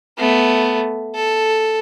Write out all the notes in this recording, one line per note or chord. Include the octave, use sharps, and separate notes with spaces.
A3 B3
A4